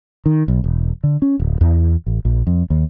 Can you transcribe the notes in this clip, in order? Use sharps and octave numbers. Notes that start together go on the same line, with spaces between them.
D#3
B1
E1
D3
C#4
D1
E2
A1
A#1
F2
D#2